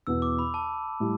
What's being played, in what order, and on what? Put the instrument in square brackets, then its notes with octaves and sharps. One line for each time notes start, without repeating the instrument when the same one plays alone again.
[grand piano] E2 B2 B3 E4 [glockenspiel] E6
[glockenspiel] D6
B5
A5
[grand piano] A2 G3 E4